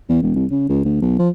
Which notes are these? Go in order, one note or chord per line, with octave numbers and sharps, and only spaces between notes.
E2
E1
C2
C#3
C#2
D2
B1
F3